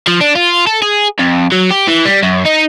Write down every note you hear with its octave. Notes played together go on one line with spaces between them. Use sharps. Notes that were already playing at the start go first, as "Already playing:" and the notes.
F3
D4
F4
A4
G#4
F2
F#3
G4
E3
G3
F#2
D#4